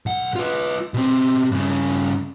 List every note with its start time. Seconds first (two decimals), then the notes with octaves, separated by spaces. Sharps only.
0.06 B1 F#5
0.36 F4 B4
0.94 B2 C4
1.52 G2 C#3